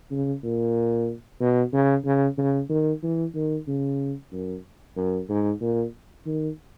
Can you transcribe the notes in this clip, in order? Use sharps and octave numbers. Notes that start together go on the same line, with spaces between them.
C#3
A#2
B2
C#3
C#3
C#3
D#3
E3
D#3
C#3
F#2
F#2
G#2
A#2
D#3